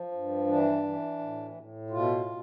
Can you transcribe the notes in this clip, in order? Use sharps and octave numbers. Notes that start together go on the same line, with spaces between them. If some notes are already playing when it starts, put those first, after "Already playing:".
Already playing: F3
G2
E3 D4
E3
A2
A2
B2 F4
B2